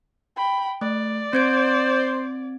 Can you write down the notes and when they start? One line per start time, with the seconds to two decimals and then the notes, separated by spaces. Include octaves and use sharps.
0.37 G5 B5
0.81 A3 D5
1.33 C4 C5 G#6 D7